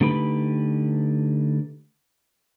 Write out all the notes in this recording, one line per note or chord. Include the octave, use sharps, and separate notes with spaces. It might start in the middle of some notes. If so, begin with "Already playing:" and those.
D3 A3 D#4 G4 B4 B5